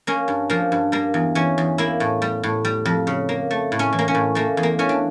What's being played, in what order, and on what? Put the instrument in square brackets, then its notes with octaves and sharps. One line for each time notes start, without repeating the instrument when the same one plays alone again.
[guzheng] A#3 C#4
G2
F3 A#3
G2
G3 A#3
E2
E3 C#4
E2
A#3 E4
A2
G3
A2
G3
F2
C#3
A#3
A3
A2
C#4
E3
A#3
C#4
A2
A3 A#3
E2
A#3
E3 C#4
D4